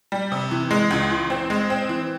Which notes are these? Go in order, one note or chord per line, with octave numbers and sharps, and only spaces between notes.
G3
C3
E3
G#3
C#2
E3
C4
G#3
C4
E3